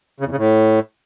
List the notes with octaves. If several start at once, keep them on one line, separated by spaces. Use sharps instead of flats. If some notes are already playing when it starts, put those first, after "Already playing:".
C#3
E2
C#3
A2